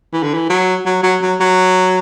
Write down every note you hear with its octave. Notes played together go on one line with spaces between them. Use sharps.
E3
D3
E3
F#3
F#3
F#3
F#3
F#3